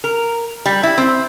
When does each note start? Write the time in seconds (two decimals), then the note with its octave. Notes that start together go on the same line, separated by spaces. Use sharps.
0.04 A#4
0.66 G3
0.83 E4
0.98 C4